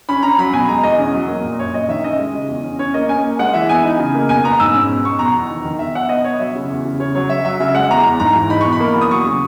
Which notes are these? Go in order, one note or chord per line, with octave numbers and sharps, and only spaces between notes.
C#4 B5
C#4 A#5
F#3 B5
B2 G#5
G#3 A#5
E2 D#5
C#4
F#3
A#3
A#2
F#2 C#5
F#2 D#5
D#3 E5
C#4 D#5
G#3
C#3
E2
C#4
C#4 C#5
A#3 D#5
C#4 G#5
A#3
G#3 F#5
E3 E5
B3 G#5
D#4
C#3
A#3
B2 G#5
B3 A#5
G#2 E6
C#4
B2
B3 C#6
B2 A#5
E2
D#3
D#3
B2 E5
B2 F#5
B3 D#5
B3 C#5
F#3 E5
C#3
E2
C#3
C#3 C#5
F#3 C#5
F#3 E5
F#3 E5
C#3 E5
G#3 F#5
E2 A#5
E2
G#2 A#5
E3
D#4 B5
B2 C#6
B5
A#3
E2
D#6
F#3 C#6
C#3